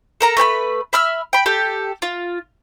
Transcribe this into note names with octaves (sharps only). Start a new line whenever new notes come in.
A4 A#4 A#5
A3 B4 G5 B5
E5 B5 E6 F6
G5 B5
G4 A4
F4